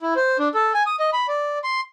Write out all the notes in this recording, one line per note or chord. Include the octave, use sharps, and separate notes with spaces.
E4
C5
D4
A4
G#5
D#6
D#5
B5
D5
C6